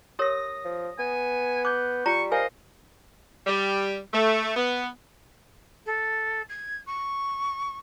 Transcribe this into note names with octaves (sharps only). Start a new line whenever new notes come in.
G4 A#4 C#5 D#6 A#6
F3
B3 G#5
D6 F#6 G6
G3 F4 A#5 C#6
A#4 C5 D#5 F5 G#5
G3
A3
B3
A4
G#6
C#6